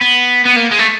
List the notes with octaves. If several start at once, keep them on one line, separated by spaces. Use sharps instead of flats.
B3
B3
A#3
G#3
A3